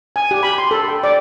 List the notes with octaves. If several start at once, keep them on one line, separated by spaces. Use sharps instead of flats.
G#5
G4
B5
C6
A4
G5
D5